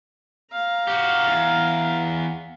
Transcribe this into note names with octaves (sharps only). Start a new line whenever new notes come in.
F5 A#5
F#4 G4
E2